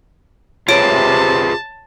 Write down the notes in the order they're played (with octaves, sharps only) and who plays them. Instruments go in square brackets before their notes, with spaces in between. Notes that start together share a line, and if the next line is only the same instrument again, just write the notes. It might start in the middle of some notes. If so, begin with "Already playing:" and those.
[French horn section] C3 [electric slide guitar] F4 G#4 B4 [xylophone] C#5 D7 [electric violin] A5